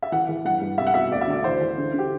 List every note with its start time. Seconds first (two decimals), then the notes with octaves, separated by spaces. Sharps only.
0.02 E5
0.12 E3 F#5
0.29 E3
0.45 G2 F#5
0.61 G2
0.78 C2 E5
0.87 F#5
0.94 B2 E5
1.12 D2 D5
1.21 E5
1.28 D3 D5
1.44 E3 C5
1.61 E3
1.78 D3
1.94 D3 G4